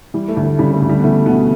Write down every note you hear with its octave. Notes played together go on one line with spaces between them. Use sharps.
E3 G3
A3
D2
A3
C#3 G3
A3
D2
G3
B3
E3 A3
D2 B2 B3